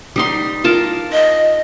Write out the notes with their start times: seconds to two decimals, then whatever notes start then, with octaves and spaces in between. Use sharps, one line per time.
0.16 G3 D#4 C6
0.64 F4 A#4 A5
1.12 D#5